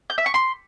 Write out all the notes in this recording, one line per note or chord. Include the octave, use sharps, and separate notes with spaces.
G6
E5
C#6
C6